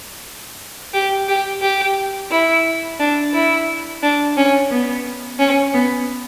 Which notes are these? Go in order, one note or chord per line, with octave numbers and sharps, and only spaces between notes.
G4
G4
G4
E4
D4
E4
D4
C#4
B3
C#4
B3